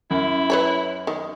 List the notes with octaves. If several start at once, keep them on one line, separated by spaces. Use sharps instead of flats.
F#2 E4
B4 C#5 B5
D#3